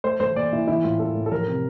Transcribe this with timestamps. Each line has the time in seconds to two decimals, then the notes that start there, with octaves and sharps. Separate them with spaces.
0.04 A3 C5
0.20 A3 C5
0.36 A#2 D5
0.52 A#2 E4
0.67 E3 E4
0.84 A2 F4
0.99 A#3 A4
1.15 A2
1.26 A4
1.32 F3 A#4
1.48 C3